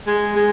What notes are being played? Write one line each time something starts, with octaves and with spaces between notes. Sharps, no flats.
G#3
G#3